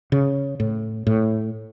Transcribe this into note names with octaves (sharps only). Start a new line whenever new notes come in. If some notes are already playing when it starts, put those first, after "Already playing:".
C#3
A2
A2